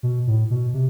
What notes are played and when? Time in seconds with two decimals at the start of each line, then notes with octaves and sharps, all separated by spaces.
0.03 B2
0.27 A2
0.50 B2
0.74 C3